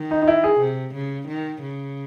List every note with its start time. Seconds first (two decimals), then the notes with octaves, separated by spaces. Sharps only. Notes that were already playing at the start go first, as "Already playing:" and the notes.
Already playing: D#3
0.11 D#4
0.22 D#4
0.28 E4
0.44 G#4
0.61 C3
0.95 C#3
1.28 D#3
1.62 C#3